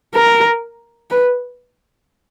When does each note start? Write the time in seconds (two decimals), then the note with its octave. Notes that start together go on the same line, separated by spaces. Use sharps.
0.15 A#4
1.10 B4